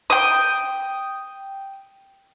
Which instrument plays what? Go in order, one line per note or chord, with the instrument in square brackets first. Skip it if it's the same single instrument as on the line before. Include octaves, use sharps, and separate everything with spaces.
[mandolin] G5 D#6